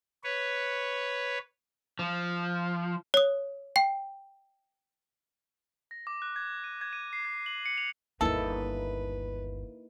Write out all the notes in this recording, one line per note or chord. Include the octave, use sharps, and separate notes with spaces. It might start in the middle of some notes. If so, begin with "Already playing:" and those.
B4 C#5
F3
C#5 D#6
G5 C7
A#6
D6
F#6
G#6
D#7
G#6
D#7
C7
G#6
F#7
C#7
F7
G1 D#2 A#3 D#4 E4 A4 B4